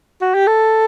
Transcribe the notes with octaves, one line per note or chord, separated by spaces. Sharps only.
F#4
G4
A4